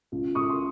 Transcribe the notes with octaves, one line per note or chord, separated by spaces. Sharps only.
C#2
C#2 C#6 D#6
C6